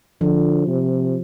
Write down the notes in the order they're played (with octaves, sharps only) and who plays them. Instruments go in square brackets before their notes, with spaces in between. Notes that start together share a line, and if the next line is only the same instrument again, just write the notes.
[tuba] D3 [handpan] F3
[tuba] C3